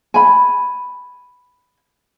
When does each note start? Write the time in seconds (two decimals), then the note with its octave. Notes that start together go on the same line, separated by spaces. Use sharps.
0.14 G#5 B5